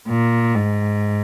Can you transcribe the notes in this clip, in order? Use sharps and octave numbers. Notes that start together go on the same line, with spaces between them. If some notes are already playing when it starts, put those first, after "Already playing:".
A#2
G#2